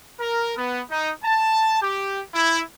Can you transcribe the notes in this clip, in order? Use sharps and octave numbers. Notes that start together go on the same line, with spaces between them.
A#4
B3
D#4
A5
G4
E4